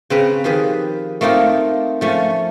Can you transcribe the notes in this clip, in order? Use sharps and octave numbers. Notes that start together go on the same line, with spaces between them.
C#3 C4 B4 A#5
D#3 F3 G4 G#4 B4
A3 A#3 C4 D#4 F4
F3 A3 C#4